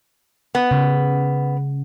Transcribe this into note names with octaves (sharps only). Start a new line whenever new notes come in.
B3
C#3